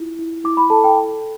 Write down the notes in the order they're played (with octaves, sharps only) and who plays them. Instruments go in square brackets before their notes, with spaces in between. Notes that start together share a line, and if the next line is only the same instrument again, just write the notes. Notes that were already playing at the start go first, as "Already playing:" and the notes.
Already playing: [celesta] E4 F4
E4
E4 D6
B5
A4 A5
G5